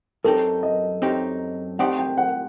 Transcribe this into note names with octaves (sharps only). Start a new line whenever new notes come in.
F#2 F#3 C4 D#4 G4 A4
D#5
F#2 F#3 C4 D#4 G4
A3 C4 D#4 G4 D5 F#5
G5
F#5